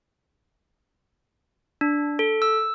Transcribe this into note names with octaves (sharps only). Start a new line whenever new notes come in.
D4
A4
E6